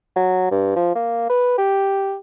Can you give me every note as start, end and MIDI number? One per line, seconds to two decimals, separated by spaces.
0.16 0.48 54
0.51 0.72 43
0.76 0.93 53
0.95 1.27 58
1.30 1.56 71
1.58 2.15 67